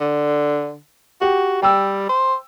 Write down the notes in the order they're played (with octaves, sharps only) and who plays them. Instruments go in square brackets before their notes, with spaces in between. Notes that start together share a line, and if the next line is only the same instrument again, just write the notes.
[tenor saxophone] D3
[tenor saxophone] F#4 [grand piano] G4
[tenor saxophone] G3 [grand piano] G5 E6
[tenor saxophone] C5